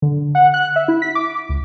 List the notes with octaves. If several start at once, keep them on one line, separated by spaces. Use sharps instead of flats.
D3
F#5
F#6
E5
E4
B6
D6
C#2